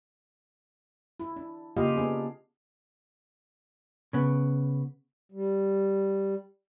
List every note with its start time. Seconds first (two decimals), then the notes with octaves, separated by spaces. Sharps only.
1.20 E4
1.36 D4
1.77 C#3 A#3 F4 G4 D#5 F5
1.96 B3 D4 G#4
4.13 C#3 B3
5.32 G3